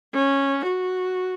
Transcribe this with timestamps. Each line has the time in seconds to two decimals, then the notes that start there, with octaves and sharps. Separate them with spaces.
0.14 C#4
0.66 F#4